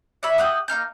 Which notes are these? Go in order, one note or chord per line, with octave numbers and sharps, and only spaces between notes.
D4 C#5 E5 B5
G4 F#5 D#6
A#3 D#4 F6 G6